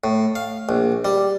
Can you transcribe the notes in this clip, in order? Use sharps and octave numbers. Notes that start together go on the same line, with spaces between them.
A2
F5
A#1
G3